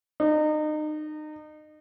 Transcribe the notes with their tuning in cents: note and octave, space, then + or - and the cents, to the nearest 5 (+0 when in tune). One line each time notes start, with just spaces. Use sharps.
D#4 -30